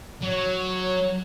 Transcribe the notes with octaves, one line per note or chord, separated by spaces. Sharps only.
F#3 C#5